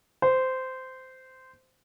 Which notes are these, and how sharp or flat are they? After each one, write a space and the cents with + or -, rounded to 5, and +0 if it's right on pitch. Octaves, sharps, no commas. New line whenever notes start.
C5 -15